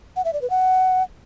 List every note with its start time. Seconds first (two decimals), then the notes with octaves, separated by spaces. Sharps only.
0.16 F#5
0.25 E5
0.33 D5
0.42 B4
0.50 F#5